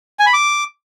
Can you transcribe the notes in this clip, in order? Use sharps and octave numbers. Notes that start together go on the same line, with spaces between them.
G#5
B5
D6